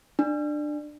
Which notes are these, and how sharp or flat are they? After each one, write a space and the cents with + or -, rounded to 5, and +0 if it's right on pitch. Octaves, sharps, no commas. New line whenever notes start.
D4 +20